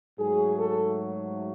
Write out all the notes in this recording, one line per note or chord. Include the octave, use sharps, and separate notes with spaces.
G#2 F#3 A3 G#4
A4